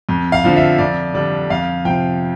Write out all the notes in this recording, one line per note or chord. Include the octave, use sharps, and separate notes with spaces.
F2
F5
D3 F3
E5
F2 D5
D3 G3 D4
F2 F5
C3 F3 G5